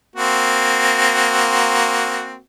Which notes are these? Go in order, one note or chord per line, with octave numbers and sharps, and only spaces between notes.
A#3 C4 F#4